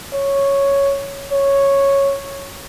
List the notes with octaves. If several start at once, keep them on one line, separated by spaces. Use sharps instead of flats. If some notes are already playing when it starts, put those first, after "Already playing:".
C#5
C#5